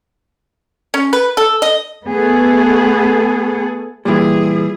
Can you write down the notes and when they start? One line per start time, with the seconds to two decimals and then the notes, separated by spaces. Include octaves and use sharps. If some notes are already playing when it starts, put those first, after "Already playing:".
0.94 C#4
1.13 B4
1.37 A4
1.62 D#5
2.08 A3 B3 G#4 A4
4.05 A#2 E3 G3 E4 G#4